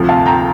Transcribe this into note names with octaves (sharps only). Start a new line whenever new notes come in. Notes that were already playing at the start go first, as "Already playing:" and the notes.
Already playing: D2 C3 F3
F5 A5
G5 A#5